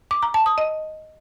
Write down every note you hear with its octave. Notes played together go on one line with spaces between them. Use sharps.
D6
A#5
A5
D#6
D#5